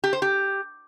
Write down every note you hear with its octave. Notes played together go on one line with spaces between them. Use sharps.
G4
C5
G4